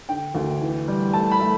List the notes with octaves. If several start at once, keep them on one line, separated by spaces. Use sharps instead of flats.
D3 G5
D2
E3
G3
A3 A5
B5
A3